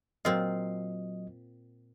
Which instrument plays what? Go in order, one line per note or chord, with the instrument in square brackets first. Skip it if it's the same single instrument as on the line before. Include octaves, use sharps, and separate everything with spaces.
[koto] A#2 C4 F4 [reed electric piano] F#3 D#5